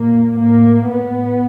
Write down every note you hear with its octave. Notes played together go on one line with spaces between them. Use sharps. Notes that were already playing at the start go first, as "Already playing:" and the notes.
Already playing: A#2 A#3
A2 A#3
A2 B3